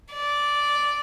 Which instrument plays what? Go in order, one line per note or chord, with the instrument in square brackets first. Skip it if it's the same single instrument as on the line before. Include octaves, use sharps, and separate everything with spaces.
[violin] D5